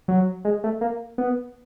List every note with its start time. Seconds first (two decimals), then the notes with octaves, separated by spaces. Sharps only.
0.08 F#3
0.45 G#3
0.64 A3
0.81 A#3
1.18 B3